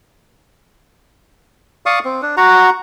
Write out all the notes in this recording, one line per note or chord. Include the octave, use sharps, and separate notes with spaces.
D5 F5 C#6 D#6
C4
D4
F#4 F#5 A#5